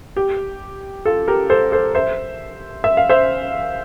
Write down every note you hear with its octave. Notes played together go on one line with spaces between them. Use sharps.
G4
F4 A4
G4 A#4
A4 C5
A4 C5
C5 E5
E5
F5
C5 E5